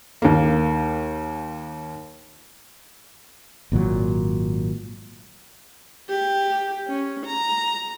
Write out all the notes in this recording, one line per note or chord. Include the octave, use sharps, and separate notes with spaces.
D#2 A#3
G#1 A#2 D3 F#3
G4
C#4
A#5